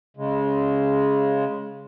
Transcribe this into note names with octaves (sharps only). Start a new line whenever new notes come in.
C#3 G#3